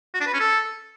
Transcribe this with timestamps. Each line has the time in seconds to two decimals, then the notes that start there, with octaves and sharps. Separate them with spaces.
0.14 F#4
0.21 D4
0.27 B4
0.33 C#4
0.40 A4